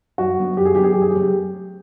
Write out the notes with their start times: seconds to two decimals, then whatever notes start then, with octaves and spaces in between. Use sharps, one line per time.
0.18 F#2 F#4
0.38 D3 F#3 B3 D4
0.57 F#2 G4
0.65 G#4
0.75 D3 F#3 B3 D4 G4
0.84 G#4
0.93 F#2 G4
1.02 G#4
1.11 C#3 F#3 A3 C4 G4